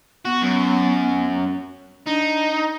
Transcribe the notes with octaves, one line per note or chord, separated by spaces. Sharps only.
B3 F#4
F#2
D4 D#4